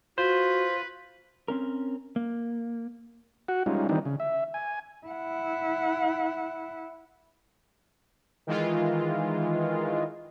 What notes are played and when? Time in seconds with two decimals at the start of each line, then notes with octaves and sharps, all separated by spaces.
0.18 F4 F#4 B4 C5
1.48 C4 C#4 A#4
2.16 A#3
3.48 F#4 F#5
3.66 G3 G#3 C#4 D#4 F4
3.89 D#3 E3 G3 C4 D4 D#4
4.05 C#3
4.20 E5
4.54 G#5
5.07 E4 F#5
8.47 D#3 E3 G#3 F4